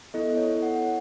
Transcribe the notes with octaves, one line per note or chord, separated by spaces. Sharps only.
B3 E4 A4 D#5
C#5
F#5